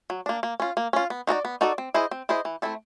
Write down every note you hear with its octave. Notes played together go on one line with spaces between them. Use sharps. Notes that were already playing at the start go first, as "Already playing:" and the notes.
F#3
A#3 D4
A#3
C#4 F4
A#3
C#4 F4
B3
D#4 F#4 A4 D5
B3
D#4 F#4 A4 D5
C4
E4 G#4 C5 D#5
C4
E4 G#4 C5 D#5
E3
A3 C4 E4 A4